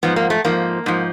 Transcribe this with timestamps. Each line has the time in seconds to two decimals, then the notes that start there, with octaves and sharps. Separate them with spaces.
0.03 G#2 F3 B3
0.16 A#3
0.30 A3
0.45 G#2 F3 A#3
0.86 G#2 F3